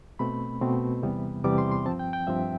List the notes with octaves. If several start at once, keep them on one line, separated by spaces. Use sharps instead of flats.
B2 A3 C4 B5
B2 A3 C4
E2 C3 E3 G3 B3
E2 C3 E3 G3 B3 D6
C6
C6
G2 F3 C4 A5
G5
G5
G2 F3 C4 E5